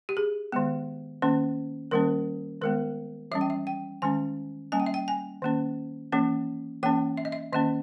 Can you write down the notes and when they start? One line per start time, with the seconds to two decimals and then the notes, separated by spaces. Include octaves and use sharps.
0.09 G4
0.17 G#4
0.52 D#3 G#3 B3
1.22 D#3 A#3 C#4
1.91 D#3 G3 A#3 C#4 A#4
2.61 D#3 G#3 B3 A#4
3.32 E3 G3 C#4 E5
3.41 G5
3.50 E5
3.67 G5
4.02 D#3 G#3 C#4 G#5
4.72 G3 A#3 C#4 G#5
4.80 G5
4.86 E5
4.94 G5
5.08 G#5
5.42 D#3 A#3 C#4
6.12 E3 A#3 C#4
6.83 E3 A#3 C#4 G5
7.17 E5
7.25 D#5
7.32 E5
7.53 D#3 A#3 C#4 D#5